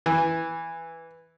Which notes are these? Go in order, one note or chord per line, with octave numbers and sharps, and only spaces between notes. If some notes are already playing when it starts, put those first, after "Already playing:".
E3